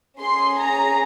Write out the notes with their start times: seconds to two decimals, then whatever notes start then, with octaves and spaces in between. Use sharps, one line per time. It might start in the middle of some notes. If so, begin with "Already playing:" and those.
0.20 C#4 G#4 C6
0.59 A#5